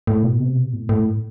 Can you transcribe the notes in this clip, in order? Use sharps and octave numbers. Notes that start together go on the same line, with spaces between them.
A2
B2
C3
B2
A2
A2